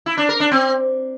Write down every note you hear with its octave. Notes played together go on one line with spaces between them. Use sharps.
E4
D4
A#4
D4
C4